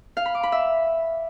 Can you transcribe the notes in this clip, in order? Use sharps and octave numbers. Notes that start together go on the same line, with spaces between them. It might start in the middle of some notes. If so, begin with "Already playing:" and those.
F5
B5
D6
B5
E5